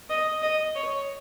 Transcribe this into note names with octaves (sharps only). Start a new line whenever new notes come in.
D#5
D#5
C#5